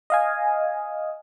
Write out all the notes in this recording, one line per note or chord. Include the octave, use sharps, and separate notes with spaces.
D#5 F5 G#5